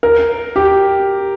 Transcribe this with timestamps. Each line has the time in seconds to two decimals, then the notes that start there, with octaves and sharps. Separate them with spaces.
0.03 A#4
0.56 G4